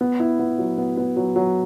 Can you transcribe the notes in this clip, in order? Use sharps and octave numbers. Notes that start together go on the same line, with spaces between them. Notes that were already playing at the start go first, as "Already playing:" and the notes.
B3
E4
B3
F#3
B3
B3
F#3
F#3